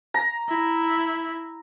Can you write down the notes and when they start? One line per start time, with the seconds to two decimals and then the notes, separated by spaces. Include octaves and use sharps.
0.14 A#5
0.49 E4